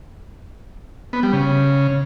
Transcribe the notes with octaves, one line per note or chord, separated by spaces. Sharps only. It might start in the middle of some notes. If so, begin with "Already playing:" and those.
B3
G3
C#3